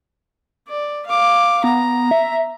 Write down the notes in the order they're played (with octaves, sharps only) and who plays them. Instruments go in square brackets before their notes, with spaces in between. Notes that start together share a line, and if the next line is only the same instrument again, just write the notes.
[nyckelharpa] D5
F5 D6
[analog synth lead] B3 [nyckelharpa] A#5
[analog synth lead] E5